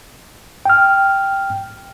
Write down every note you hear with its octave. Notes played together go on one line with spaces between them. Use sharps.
G5 F6